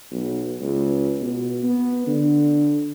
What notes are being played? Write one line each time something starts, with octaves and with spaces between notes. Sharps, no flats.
B1
C#2
B2
B3
D3